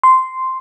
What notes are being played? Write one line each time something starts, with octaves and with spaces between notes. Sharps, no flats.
C6